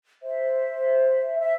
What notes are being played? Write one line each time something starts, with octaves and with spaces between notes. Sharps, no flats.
C5 E5
E5